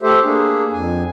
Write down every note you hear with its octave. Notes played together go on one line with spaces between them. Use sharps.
A3 G4 A4 C5 E5
A#3 D4 G#4
F2 G#5